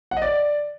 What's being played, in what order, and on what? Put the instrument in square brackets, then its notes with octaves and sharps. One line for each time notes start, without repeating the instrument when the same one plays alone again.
[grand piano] F#5
D#5
D5